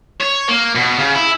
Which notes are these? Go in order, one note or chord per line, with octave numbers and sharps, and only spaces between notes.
C#5
A#3
B2
C#3
E4